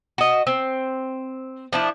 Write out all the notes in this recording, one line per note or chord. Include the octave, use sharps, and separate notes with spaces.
F#4 D#5
C4
F3 D4 E4